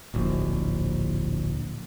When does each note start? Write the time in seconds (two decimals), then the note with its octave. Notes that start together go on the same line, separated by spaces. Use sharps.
0.14 D1 A#1